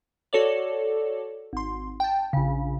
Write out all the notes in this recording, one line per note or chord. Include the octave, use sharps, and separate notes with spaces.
F#4 A4 C#5 D5
G#1 C6
G5 A5
A#1 C#3